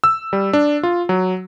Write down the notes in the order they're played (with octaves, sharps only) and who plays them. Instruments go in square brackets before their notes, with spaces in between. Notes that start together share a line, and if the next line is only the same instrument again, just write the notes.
[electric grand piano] E6
G3
D4
F4
F#3